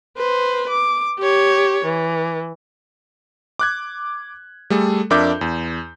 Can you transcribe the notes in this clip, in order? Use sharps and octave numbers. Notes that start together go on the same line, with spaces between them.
B4 C5
D6
G4 C#5
E3
D6 F#6 G#6
G3 A3 G#4 A4
F2 D4 A#4 E5 D6 G6
E2